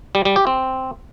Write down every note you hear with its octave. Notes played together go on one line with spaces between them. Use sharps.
G3
G3
G4
C4